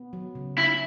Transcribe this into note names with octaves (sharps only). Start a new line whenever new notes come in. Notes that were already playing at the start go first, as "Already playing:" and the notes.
Already playing: B3
F#3
C#3
C#4 E4